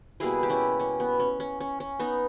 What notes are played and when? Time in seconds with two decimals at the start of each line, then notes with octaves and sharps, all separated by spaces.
0.20 B2 G3 A#3 E4 G#4
0.43 G4
0.50 C#4 E4
0.80 C#4
1.00 B3
1.20 C#4
1.40 C#4
1.60 C#4
1.80 C#4
2.00 B3 D#4